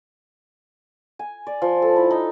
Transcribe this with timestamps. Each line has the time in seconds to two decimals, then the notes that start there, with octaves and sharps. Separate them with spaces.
1.19 G#5
1.47 D5
1.62 F3
1.82 A4
1.96 E4
2.11 D#4